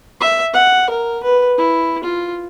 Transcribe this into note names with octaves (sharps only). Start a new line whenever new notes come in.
E5
F#5
A#4
B4
E4
F4